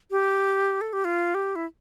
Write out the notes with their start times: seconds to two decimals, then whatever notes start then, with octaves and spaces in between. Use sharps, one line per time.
0.11 G4
0.81 A4
0.93 G4
1.05 F4
1.34 G4
1.56 E4